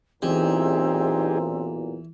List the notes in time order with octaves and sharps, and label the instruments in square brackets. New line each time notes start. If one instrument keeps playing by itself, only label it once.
[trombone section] B1 E2 A#2 [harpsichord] E3 [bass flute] C4 [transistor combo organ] D#4 G4 G#4